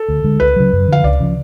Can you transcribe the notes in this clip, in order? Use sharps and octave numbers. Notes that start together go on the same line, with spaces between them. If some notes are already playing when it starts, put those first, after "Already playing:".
Already playing: A4
D2
D3 G#3
C#2 B4
C#3 F#3
F#2
D3 F3 F5
C#2 D5
C#3 F3